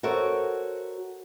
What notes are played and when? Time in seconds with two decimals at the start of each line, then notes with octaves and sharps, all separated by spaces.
0.03 F#4 A4 A#4 C5 C#5 E5